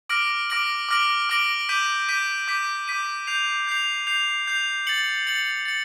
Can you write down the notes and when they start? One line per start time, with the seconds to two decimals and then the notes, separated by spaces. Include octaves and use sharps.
0.09 D6 F6 A#6 D7 F#7
0.50 D6 F6 A#6 D7 F#7
0.89 D6 F6 A#6 D7 F#7
1.29 D6 F6 A#6 D7 F#7
1.69 D6 G6 B6 D#7
2.09 D6 G6 B6 D#7
2.48 D6 G6 B6 D#7
2.88 D6 G6 B6 D#7
3.27 G6 C7 F7
3.67 G6 C7 F7
4.07 G6 C7 F7
4.47 G6 C7 F7
4.87 A6 C#7 F#7
5.27 A6 C#7 F#7
5.65 A6 C#7